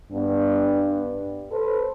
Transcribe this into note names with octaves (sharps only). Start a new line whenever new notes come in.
G2 B3 D4
A4 B4 C5